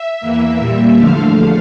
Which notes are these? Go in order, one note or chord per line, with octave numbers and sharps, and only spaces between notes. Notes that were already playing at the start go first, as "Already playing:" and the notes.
Already playing: E5
E2 E3 A#3
A#2 G3 A#3
E2 D3 F3 A3 F5